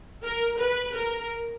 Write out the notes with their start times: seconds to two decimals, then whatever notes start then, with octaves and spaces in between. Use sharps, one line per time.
0.23 A#4
0.59 B4
0.95 A#4